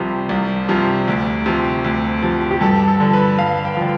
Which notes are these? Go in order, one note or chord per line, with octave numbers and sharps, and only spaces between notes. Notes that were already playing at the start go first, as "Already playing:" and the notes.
Already playing: C2 C3 F3
C2
C3 F3
D2
C3 F3
D2
C3 F3
G4
G2 A4
A4
D3 F3
B4
G2 F5
G5
D3 F3